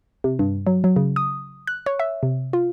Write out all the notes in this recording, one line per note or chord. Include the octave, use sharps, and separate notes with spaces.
C3
G2
F#3
F#3
C#3
D#6
F#6
C#5
E5
C3
F4